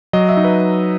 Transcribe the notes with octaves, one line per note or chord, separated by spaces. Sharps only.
F#3 D#5
E5
D#4
B4